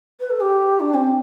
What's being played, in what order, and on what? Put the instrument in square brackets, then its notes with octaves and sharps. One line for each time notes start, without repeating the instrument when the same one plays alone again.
[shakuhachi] B4
A4
G4
D4
C4